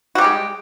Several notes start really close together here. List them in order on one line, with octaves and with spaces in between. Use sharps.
F#4 G3 G4 G#3